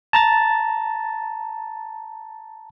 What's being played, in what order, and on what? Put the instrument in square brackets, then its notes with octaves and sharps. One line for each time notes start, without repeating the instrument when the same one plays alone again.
[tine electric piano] A5 A#5 A6